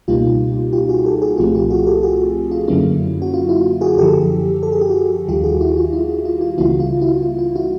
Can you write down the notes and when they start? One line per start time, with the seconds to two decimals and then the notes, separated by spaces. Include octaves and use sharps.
0.08 C#2 B2 G3 A#3 D#4 F4 G4
0.73 F4 G4
0.89 F#4 G#4
1.05 G4 A4
1.22 F#4 G#4
1.38 C2 A#2 F3 A3 C4 F4 G4
1.54 F4 G4
1.70 F#4 G#4
1.87 G4 A4
2.03 F#4 G#4
2.51 F4
2.68 F#2 D3 F#3 A#3 C#4 E4
3.22 F#4
3.34 F4
3.49 E4 F#4
3.81 F#4 G#4
3.97 F#2 D3 F3 G4 A4
4.63 A4
4.72 G#4
4.81 G4
4.89 F#4 G#4
5.28 D#2 D#3 G3 F4 G4
5.44 F#4 G#4
5.61 E4 F#4
5.77 F4
5.93 E4
6.09 F4
6.25 F4
6.41 F4
6.58 C#2 C#3 E3 G3 A#3 E4 F#4
6.80 F4
7.01 E4 F#4
7.23 F4
7.39 F4
7.56 E4 F#4